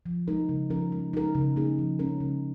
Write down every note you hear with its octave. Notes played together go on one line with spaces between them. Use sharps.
F3
G#3 D#4 A#4
C#3
F3 C#4 A#4
G#3
D#4 A#4
C#3
A#3 D#4 G#4
F3
G#3 C#4 A#4
C#3